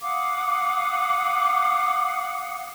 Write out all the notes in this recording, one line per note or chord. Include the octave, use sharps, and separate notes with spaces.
F5 F#5 D6 D#6